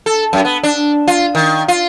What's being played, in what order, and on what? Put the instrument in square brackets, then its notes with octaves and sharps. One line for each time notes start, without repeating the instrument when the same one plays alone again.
[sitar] A4
F#2
B3
D4
F4
D#3
F4